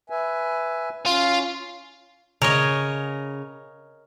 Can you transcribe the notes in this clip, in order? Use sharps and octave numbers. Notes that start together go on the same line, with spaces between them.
B4 E5 G#5
C#4 F4
C#3 A#4 C#5 D#5